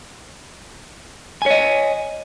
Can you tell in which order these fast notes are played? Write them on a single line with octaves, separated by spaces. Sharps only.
G#5 C#5 D#5